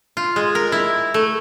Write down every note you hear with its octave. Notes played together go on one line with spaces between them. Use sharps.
F4
G#3
A#4
E4
A3